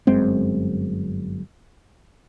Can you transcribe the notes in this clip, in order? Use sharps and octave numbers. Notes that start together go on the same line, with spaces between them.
G1 F#2 G#3 C4